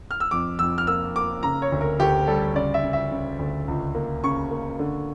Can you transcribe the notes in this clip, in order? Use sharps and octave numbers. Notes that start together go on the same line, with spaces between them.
F6
E6
F2 D6
F2 E6
F6
A#3 E6
A#3 D6
C#3 A#5
C#5
D2
A#4
D2 G4
G3 A4
C#3 D5
E5
C#3
E5
C#3
D2
C#2
A#3
C#3 C#6
A#3
D3